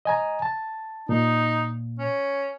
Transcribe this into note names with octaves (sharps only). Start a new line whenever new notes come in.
D#5 G#5 A#5
A5
A#2 D#4
C#4